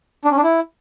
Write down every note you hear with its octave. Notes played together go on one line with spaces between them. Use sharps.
D4
C#4
D4
E4